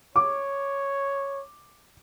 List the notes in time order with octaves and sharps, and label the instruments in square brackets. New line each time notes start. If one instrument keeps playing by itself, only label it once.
[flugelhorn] C#5 [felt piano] D6